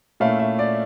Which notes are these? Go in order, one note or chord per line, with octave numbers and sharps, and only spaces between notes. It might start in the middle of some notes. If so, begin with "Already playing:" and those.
A#2 A3 C#4 E4 F5
E5
D5